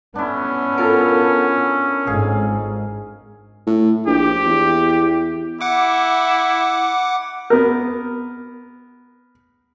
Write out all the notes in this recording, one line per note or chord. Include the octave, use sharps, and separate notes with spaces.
B3 C#4 D4 E4
F4 A4 A#4
G#1 G#2 G#4 F5 G#5
A2
A#1 G4
E2
E4 F#5 D6
B3 A#4